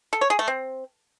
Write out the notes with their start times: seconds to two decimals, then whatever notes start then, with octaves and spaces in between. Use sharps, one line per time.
0.13 A4
0.21 C#5
0.30 G#4
0.39 A3
0.48 C4